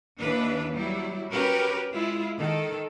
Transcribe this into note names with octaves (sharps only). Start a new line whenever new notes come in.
D#2 E3 D4 B4
F#3 G3 E4
C#4 F#4 G4 A#4 B4
G#3 E4 F4
D#3 A4